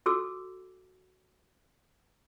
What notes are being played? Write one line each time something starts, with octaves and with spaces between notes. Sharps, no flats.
F#4 A4 D6 E6